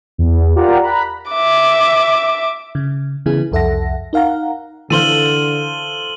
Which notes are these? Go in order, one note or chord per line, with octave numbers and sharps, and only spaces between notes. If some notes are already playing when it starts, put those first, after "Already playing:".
E2
F4 G4 A#4 D5 F#5 A#5
A#5 B5 F#6
E5 D6
C#3
C#3 E3 B3 E4 G#4
C2 F2 A4 E5 F#5 A#6
D#4 A#4 F5 F#5 A#5
D3 E3 A4 C5 F5 D#7 F#7 G7